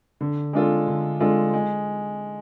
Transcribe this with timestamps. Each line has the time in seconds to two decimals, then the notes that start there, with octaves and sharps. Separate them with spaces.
0.21 D3
0.53 G#3 D4 F4 A4
0.87 D3
1.20 G#3 D4 F4 A4
1.53 G#3